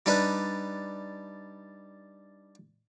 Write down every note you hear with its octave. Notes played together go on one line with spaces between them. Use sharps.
G3 D4 D#4 B4